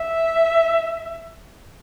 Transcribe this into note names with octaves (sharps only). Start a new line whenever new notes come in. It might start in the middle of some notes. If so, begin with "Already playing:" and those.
Already playing: E5